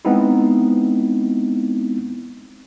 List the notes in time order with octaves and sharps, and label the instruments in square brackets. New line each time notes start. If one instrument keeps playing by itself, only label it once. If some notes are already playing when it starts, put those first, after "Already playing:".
[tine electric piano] G#3 B3 C4 D#4 E4